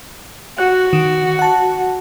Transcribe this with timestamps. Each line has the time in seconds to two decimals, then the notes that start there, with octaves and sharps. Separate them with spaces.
0.58 F#4 F#6
0.93 D#3
1.39 F#5 A5